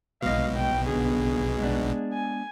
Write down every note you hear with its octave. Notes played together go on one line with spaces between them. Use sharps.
B1 B2 G#3 D#5 F5
G5
D3 B3 G#4
G#3 B3 D4
G#5